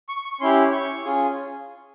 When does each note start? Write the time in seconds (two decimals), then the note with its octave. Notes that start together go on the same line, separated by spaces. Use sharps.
0.09 C#6
0.25 C#6
0.41 C#4 E4 G4 C6
0.72 C#6
1.05 C#4 F4 G#4